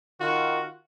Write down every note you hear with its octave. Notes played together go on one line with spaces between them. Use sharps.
D#3 F4 F#4